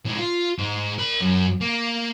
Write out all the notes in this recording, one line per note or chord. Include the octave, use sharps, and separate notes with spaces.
A2 G#3
F4
G#2 D#4
A#4 B5
F#2
A#3